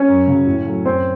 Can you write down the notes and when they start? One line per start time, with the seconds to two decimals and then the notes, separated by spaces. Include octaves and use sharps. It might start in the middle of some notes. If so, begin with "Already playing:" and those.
Already playing: C#4 C#5
0.08 F#2
0.27 C#3 F#3
0.47 A2
0.66 F#3 A3
0.85 F#2 C4 C5